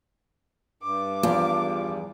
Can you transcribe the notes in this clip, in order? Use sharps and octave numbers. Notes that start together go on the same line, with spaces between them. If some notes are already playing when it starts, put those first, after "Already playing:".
G2 D6
E2 F3 F4